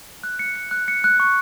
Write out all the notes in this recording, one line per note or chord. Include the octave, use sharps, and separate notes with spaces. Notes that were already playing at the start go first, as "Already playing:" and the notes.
F#6
C#7
C#7
F#6
C#7
F#6
C#6